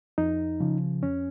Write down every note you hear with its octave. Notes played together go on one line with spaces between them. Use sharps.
F2 D#4
C#3 F3
F2 C#4